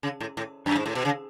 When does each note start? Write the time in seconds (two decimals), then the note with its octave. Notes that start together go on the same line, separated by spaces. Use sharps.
0.03 C#3
0.20 A2
0.37 A2
0.66 F#2
0.76 G#2
0.86 A2
0.95 B2
1.05 C#3